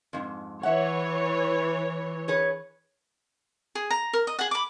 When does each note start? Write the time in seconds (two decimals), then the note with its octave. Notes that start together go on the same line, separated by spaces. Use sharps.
0.13 F2 G#2
0.63 E3 C#5 E5 F#5
2.28 G#4 B4 C#5
3.75 G#4
3.90 A#5
4.13 A#4
4.27 D#5
4.39 G#4 F#5
4.51 B5 D6